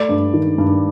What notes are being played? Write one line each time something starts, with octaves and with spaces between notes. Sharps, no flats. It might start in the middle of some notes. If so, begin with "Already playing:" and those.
Already playing: A3 D5
G2
D#3
G2